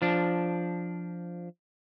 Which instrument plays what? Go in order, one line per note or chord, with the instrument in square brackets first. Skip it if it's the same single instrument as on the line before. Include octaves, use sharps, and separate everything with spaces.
[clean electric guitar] F3 D4